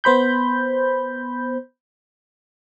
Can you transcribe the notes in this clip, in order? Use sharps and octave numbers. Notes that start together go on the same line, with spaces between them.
B3 C5 B5 G6